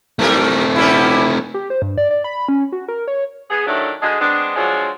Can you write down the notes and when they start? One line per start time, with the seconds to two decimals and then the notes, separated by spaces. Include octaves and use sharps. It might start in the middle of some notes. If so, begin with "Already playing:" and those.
0.19 G#2 F#3 A3 C4 A#4
0.76 B2 G3 C#4 E4
1.54 G4
1.70 C5
1.82 G2
1.98 D5
2.11 D5
2.24 B5
2.48 C#4
2.72 F#4
2.88 A#4
3.08 C#5
3.50 B3 G#4
3.66 D#3 F#3 A3 D4 E4
4.02 D3 G#3 D4 F#4 G#4
4.19 G#3 B3 C4 D4
4.56 F3 F#3 G#3 D4 F#4